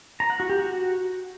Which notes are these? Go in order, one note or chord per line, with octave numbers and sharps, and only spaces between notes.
A#5
F#5
F#4
G4
F#4